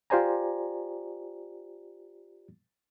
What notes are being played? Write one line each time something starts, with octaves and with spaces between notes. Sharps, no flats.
F4 G4 C5 D5 G#5 A#5